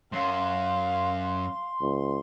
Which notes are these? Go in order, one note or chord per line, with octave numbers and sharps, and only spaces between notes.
F#2 F5 C6
C#2